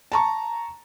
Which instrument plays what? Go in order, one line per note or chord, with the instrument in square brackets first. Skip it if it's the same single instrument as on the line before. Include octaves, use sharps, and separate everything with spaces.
[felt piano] A5 A#5 C#6